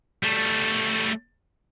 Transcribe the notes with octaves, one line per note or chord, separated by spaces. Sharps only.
G3 A3